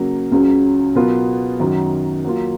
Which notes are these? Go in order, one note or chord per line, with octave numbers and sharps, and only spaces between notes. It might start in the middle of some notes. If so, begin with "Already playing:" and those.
Already playing: C#3 F#3 A#3
C#2 C#3 F#3 C#4
B2 F#3 B3 F4 A#4
F#2 D#3 F#3
F#3 A#3 F4